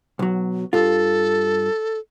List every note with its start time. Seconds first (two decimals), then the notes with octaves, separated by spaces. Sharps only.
0.19 B1 F#3
0.73 G2 F4 A4